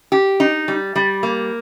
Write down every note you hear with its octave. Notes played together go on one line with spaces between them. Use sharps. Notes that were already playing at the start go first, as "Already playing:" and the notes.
G4
D#4
G3
G3
A#3